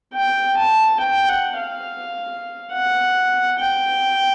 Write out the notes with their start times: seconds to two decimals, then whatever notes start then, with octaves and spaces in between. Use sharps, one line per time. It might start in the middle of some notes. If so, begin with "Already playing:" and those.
0.13 G5
0.57 A5
0.99 G5
1.28 F#5
1.56 F5
2.72 F#5
3.58 G5